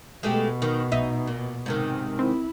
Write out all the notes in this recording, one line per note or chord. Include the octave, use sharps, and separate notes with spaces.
B2 G#3 A3 G4
D#3
B1 D#4 E5
A#2
G#2 C3 D#3
C4 E4